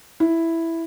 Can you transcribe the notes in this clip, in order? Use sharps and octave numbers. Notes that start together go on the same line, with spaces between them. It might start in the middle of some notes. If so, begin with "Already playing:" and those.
E4